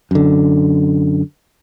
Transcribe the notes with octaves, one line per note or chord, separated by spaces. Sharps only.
F#2 D3